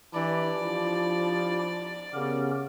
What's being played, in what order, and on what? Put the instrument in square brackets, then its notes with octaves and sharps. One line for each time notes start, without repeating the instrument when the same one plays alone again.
[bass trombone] E3 [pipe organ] D4 E4 G4 [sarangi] D5
[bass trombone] F3
[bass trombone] C#3 [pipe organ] B3 G4 A#4